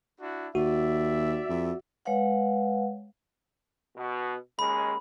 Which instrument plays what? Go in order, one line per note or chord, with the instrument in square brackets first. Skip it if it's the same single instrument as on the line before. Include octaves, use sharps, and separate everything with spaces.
[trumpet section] D4 E4 F#4
[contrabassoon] D#2 [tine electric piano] F#4 [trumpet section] D5 E5
[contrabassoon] F2
[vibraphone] G#3 B4 C#5 F5 F#5
[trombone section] B2
[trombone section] D#2 G#3 C#4 [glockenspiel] B5